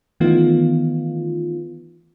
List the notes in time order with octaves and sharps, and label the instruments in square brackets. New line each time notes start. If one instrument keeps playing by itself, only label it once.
[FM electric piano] D#3 E3 A3 B3 D#4 F4